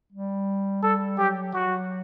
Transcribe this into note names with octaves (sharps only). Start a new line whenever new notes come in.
G3
G3 A4
F#3 G4
F#3 F#4